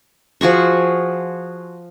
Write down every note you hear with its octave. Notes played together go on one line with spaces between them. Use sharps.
F3 F#4 G#4 C#6